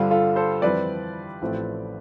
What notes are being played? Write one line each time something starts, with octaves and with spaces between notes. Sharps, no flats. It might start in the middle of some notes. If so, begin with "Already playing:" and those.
Already playing: G2 D3 G3 C4 F4
F4 A4
A4 C5
F2 E3 G3 C4 B4 D5
A1 A2 F3 A3 C4